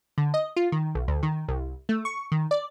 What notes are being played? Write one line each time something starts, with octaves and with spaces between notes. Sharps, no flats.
D3
D#5
F4
D#3
B1
D2
D#3
C2
A3
C#6
D#3
D5